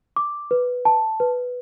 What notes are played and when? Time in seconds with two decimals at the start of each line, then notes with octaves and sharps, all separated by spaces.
0.16 D6
0.51 B4
0.85 A5
1.20 B4